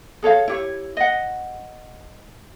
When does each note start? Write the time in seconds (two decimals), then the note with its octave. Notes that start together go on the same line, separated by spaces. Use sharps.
0.23 G#4 A4 C#5 F5
0.48 E4 G4 C#5
0.97 D#5 F#5